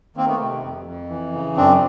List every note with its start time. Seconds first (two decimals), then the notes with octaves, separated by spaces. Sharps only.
0.16 D#3 A#3 C4
0.28 A3 B3
0.39 C3 A3
0.63 F2
0.86 F2
1.09 E3
1.33 C#3
1.56 F#2 C4 D4